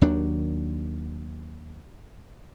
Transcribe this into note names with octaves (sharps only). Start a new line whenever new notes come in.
D#2 D#3 F#3 D4